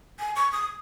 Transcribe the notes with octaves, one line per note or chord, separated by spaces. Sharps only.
G#5
C#6
D#6